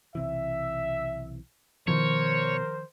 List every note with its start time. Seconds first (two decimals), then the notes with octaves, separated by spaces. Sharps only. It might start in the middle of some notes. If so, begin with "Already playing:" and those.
0.15 B1 C3 E3 E5
1.88 B2 D#3 F3 A#4 C5 C#5